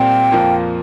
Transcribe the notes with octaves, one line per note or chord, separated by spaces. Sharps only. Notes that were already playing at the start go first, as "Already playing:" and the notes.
Already playing: A#2 G3 C4 F4 G5
F2 F3 A#3 F4